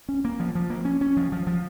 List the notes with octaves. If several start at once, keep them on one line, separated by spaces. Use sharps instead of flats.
C#4
A#3
F3
F3
A#3
C#4
C#4
F3
F3
F3